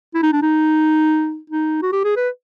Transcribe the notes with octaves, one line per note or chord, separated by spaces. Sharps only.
E4
D#4
D4
D#4
D#4
F#4
G4
G#4
B4